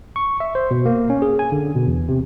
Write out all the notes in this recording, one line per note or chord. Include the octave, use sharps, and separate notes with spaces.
C#6
E5
C5
B2
A#3
C#4
G#4
G#5
D3
B2
E2
C3